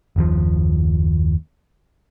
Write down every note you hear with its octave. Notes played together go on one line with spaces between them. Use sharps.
F#1 D#2 F3